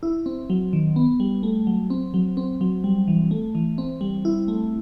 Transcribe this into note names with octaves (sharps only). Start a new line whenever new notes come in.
E4
C4
F#3
D#3
B3
G3
A3
F#3
C4
F#3
C4
F#3
G3
E3
A3
E3
C4
G3
E4
A3